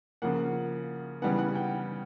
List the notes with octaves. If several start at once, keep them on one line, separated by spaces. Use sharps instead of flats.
C#3 F3 A#3 F#5
C#3 E3 G3 B3 F#5
F#5
G5